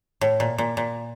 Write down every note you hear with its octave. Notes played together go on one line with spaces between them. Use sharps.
A2
A#2
A#2
A#2